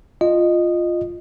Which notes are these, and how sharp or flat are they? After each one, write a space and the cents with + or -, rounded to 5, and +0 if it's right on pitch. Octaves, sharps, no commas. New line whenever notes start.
F4 +0 D#5 -15